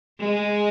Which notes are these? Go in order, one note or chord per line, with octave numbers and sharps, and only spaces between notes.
G#3